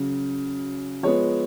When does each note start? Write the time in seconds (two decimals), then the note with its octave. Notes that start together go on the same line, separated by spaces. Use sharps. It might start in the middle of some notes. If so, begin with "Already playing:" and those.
Already playing: C#3 F#3
1.03 F3 G#3 B3 C#5